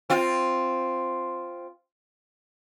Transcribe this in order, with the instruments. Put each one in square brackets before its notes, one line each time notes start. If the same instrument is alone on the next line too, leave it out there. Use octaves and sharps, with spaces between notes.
[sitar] C4 F4